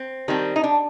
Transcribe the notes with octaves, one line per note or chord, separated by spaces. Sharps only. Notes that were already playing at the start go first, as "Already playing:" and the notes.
Already playing: C4
D#3 G3 C4
D#4
D4